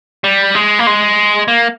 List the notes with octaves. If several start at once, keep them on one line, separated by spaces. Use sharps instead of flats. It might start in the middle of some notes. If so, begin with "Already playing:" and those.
G3
G#3
A#3
G#3
A#3